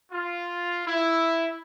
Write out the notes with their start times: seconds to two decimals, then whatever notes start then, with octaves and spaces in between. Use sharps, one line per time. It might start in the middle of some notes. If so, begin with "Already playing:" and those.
0.11 F4
0.87 E4